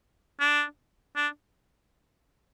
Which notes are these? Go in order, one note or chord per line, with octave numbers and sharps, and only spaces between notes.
D4
D4